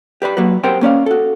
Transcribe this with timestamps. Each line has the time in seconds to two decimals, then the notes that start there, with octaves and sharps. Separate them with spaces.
0.22 G4 B4 D5 B5
0.37 F#3 A#3 F#4 B4
0.64 C4 G4 A#4 C5 F#5 G5
0.81 A#3 C#4 D5 F5
1.06 F#4 A4